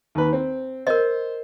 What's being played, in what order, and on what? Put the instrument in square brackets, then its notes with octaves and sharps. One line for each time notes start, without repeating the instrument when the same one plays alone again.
[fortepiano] D#2 B4
C4
[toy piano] A#4 D#5 [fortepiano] C5